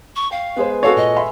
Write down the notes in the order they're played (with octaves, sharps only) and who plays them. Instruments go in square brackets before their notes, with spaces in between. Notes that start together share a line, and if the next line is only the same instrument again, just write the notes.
[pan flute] C#6
[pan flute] F5 [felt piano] G5
[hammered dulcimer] G#3 B4 [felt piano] B3 G#4 C5
[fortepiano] F#4 A4 C#5 [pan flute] F5
[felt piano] A#2 [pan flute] D#5
[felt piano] E5 B5 C6